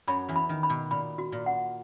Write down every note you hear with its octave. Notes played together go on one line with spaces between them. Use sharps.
F#2 F#3 B5
E2 E3
B5
D#3
B5
B2
A#2 B5
F#4
A#2
F#5